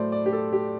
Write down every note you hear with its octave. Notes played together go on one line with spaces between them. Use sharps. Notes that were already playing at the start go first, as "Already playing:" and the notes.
Already playing: A2 F#3 A3 C5 D5
D5
G4
A4
G4